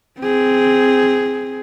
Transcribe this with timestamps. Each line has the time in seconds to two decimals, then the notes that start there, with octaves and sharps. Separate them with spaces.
0.20 C4 G#4